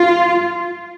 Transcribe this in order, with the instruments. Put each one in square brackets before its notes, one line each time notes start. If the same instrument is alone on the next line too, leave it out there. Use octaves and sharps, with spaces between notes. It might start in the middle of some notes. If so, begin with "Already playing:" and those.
Already playing: [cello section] F4